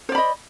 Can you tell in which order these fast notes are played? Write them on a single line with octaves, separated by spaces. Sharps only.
C5 D5 B5 D#5